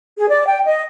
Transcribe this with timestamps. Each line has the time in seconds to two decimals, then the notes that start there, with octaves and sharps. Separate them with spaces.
0.17 G#4
0.29 D5
0.46 G5
0.66 D#5